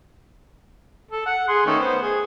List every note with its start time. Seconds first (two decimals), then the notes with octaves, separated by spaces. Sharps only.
1.11 A4
1.26 F#5
1.48 G#4 C6
1.66 D#3 A3 C#4
1.80 B3 C5
2.02 G#4